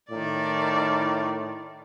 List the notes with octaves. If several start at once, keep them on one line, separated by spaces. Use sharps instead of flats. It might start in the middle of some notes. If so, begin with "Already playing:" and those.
A2 D#3 D5